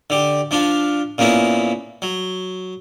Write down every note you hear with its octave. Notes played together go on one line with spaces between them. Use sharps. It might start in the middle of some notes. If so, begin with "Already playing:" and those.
D3 G4
F3 D4 F4
A#2 C#3 A#3 B3 E4
F#3